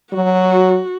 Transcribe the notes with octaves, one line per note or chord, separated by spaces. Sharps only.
F#3 F#4